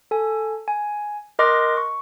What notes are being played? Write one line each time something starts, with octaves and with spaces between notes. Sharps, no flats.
A4 G#5
G#5
A#4 D#5 C6 D6 F#6 A#6
C#6